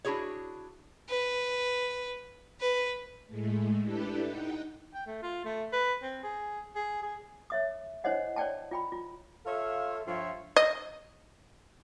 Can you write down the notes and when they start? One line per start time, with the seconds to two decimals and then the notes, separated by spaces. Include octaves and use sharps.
0.05 D4 E4 F#4 G#4 C#5
1.09 B4
2.60 B4
3.27 A2 G#3 A3
3.83 D4 E4 G4 A4 B4
4.24 D#4 F#5 G5
4.94 G5
5.06 A3
5.22 F4
5.45 A3
5.73 B4
6.02 C4
6.24 G#4
6.75 G#4
7.03 G#4
7.50 C#5 E5 D#6
8.04 D4 E4 C5 C#5 D#5 F#5
8.36 C#5 D5 G5 A5
8.71 F4 G5 B5
8.92 F4
9.46 F4 A4 C#5 E5 F5
10.07 G2 F3 F4 C#5 E5
10.56 D#5